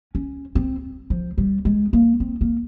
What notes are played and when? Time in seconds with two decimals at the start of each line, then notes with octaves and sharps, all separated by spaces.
0.15 C#4
0.55 C4
1.10 F3
1.38 G3
1.65 G#3
1.93 A#3
2.20 C4
2.41 A#3